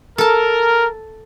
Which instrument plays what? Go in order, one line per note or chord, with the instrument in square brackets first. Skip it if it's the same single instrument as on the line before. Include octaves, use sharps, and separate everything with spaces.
[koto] A4 A5 [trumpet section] A#4